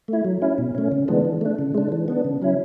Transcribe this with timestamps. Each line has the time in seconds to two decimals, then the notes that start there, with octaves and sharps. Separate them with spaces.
0.08 A3 E4
0.25 F#3
0.42 C#4 E4
0.58 B2
0.75 A3 C#4
0.92 C#3
1.08 E3 G#3 B3 D4
1.25 E3
1.41 A3 D4
1.59 C#3
1.74 G#3 D4
1.92 E3
2.08 B3 D4
2.24 C#3
2.42 F#3 C#4 E4